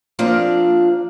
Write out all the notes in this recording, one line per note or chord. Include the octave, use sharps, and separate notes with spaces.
F3 A#3 C4 D4 F4 D5